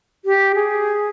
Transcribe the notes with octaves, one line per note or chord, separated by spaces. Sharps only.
G4
G#4